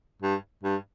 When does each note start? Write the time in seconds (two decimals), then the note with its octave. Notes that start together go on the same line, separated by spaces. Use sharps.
0.22 G2
0.63 G2